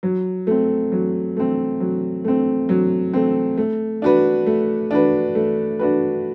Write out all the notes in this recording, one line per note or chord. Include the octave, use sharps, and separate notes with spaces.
F#3
A3 C4
F#3
A3 C4
F#3
A3 C4
F#3
A3 C4
A3
D4 F#4 B4
A3
D4 F#4 B4
A3
D4 F#4 B4